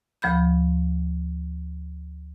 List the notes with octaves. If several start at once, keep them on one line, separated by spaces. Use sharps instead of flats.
D2 F3 B5 G6